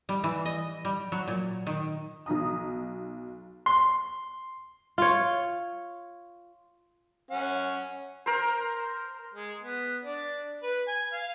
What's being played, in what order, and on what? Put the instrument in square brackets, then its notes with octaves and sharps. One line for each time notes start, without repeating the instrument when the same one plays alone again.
[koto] G3
E3
D#5
G3
F#3
A#2
D#3
[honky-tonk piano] B1 D#4 A#5 D#6
[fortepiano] C6
[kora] F4 C#5
[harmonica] C#4 F#5
[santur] A#4 C5
[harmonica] G#3
B3
D4
B4
G#5
F5